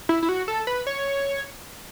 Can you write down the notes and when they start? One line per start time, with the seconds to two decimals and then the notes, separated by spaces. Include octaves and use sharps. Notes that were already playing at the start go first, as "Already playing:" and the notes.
0.09 E4
0.22 E4
0.29 F#4
0.48 A4
0.67 B4
0.87 C#5